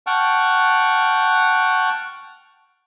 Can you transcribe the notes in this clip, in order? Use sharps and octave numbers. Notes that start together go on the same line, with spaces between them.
F#5 G5 A5 C#6 F6